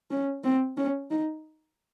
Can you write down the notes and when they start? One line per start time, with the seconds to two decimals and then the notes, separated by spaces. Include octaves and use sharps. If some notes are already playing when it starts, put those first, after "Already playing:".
0.11 C#4
0.44 C4
0.77 C#4
1.11 D#4